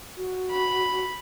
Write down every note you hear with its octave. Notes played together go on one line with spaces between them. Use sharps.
F#4
B5